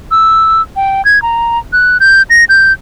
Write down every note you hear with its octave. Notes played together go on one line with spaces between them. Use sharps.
E6
G5
G#6
A#5
F#6
G6
A#6
G6